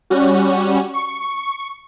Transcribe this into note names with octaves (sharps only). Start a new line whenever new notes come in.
G3 C#4 F#4
C#6